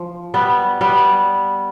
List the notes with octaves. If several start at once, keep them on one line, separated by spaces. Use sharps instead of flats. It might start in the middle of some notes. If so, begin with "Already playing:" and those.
Already playing: F3
G3 B3
G3 B3